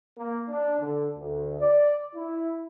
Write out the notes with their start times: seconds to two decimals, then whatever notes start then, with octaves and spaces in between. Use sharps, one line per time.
0.18 A#3
0.48 D4
0.79 D3
1.17 D2
1.59 D5
2.15 E4